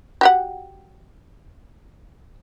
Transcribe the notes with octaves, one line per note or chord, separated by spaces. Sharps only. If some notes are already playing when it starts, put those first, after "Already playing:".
F#4 G4 F#5